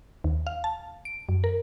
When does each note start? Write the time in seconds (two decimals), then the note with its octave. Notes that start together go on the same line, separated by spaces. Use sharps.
0.24 D#2
0.47 F5
0.64 A5
1.05 D7
1.29 F#2
1.44 A#4